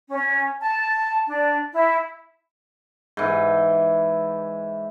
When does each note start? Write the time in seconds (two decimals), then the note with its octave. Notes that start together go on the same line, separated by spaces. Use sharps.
0.09 C#4
0.62 A5
1.27 D4
1.72 E4
3.17 G#2 E3